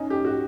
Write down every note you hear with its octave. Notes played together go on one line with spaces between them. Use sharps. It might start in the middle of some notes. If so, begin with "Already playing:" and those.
Already playing: C#4 D#4
G4
F#4